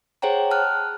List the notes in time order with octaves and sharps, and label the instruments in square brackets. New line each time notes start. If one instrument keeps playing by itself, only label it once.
[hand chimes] G#4 C5 C#5 F#5 G5 A#5
A5 F6 F#6